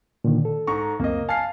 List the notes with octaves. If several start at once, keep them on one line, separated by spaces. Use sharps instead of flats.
A#2 D3 D#3
A4
G#2 A#5 C#6
C#2 F#2 A#3 C4 D#5
F5 G#5 A5 F6 C7